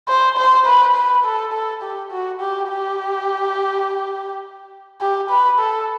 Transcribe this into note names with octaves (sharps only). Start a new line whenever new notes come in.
C5
C5
B4
B4
A4
A4
G4
F#4
G4
G4
G4
B4
A4